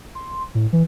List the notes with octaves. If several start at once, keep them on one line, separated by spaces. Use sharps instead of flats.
C6
A2
E3